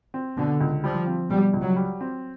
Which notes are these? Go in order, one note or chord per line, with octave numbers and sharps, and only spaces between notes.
C4
B2 D3
C#2
F3 G3
C4
B2 G3
C#2
F#3
G3
C4